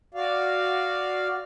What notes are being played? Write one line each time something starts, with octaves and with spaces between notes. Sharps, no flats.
F#4 D5 F5